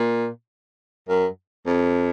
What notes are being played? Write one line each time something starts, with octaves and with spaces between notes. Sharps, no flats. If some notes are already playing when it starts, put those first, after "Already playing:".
Already playing: A#2
F#2
F2